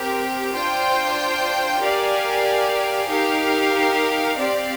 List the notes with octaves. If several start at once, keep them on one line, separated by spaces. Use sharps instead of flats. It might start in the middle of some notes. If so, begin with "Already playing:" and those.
Already playing: C4 G4 A#4
D4 F4 C5 G5
G4 A#4 D5 F5 G#5
D#4 G4 A#4 F5
C4 G4 D5 F5